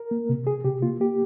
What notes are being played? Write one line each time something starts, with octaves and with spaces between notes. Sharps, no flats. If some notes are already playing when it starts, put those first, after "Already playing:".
Already playing: A#4
A#3
C3
C3 G#4
C3 G4
A#3 F4
A#3 G4